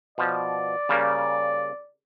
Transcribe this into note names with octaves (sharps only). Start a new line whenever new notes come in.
B2 F3 D5
C#3 G3 A#3